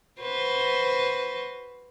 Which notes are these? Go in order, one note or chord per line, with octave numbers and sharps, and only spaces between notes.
F#4 B4 C5